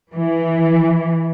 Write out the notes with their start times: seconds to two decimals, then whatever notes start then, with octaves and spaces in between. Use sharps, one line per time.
0.13 E3